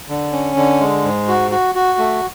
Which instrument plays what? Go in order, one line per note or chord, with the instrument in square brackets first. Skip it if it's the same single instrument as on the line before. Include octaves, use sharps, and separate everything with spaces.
[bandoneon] D3
C#4
D3
G#3
G#2
F#4
F#4
F#4
A3